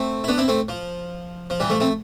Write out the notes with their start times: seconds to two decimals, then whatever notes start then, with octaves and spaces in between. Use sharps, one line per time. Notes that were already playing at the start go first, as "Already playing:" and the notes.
Already playing: A3 C4
0.24 E4
0.28 B3 D4
0.38 C4 E4
0.48 A3 C4
0.68 F3
1.50 F3
1.60 E3 G3
1.70 F3 A3
1.80 A3 C4